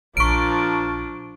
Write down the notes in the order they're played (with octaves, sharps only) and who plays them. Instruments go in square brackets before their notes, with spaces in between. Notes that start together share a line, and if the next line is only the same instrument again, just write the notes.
[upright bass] A#1 [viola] F3 D4 [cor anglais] A#4 [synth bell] C#6 D7